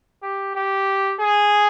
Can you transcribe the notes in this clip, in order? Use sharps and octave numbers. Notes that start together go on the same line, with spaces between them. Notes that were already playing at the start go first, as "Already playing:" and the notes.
G4
G4
G#4